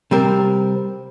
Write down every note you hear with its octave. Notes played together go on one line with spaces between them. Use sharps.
C3 G3 C4 A#4